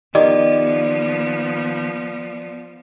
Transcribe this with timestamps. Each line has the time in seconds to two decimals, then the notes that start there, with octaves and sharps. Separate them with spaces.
0.15 D#3 F3 B3 G4 D5 D#5 D6